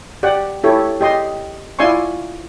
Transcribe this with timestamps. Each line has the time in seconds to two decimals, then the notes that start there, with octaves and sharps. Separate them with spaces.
0.23 G4 D5 F#5
0.64 E4 G4 A4 C#5
1.01 G4 D#5 C6
1.79 E4 F4 D5 G#5 C6 C#6